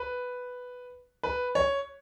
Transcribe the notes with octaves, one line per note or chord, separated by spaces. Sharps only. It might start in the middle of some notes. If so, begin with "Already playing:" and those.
Already playing: B4
B4
C#5